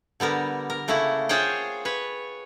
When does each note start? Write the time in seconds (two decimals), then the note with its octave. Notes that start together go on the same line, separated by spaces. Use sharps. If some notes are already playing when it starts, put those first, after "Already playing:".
0.20 D3 G3 B3 A#4
0.70 A#4
0.88 C#3 A3 A#3 E4 F#5
1.29 F4 G#4 C5 C#5 F#5 G5
1.85 B4 C#5